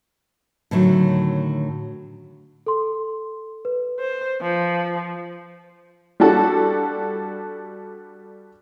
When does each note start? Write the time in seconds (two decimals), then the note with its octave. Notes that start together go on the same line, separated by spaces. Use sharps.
0.71 A2 D3 D#3 F#3
2.66 A4 C6
3.65 B4
4.00 C5
4.41 F3
6.20 G3 D4 F#4 A4